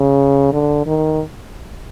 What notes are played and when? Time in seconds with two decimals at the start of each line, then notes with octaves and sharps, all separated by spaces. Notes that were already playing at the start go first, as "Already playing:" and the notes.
Already playing: C#3
0.53 D3
0.86 D#3